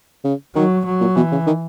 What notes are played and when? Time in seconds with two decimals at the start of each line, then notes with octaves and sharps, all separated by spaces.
0.24 C#3
0.55 D#3 F#3
0.86 F#3
1.01 A#2
1.16 B2 E3
1.32 C#3
1.47 D#3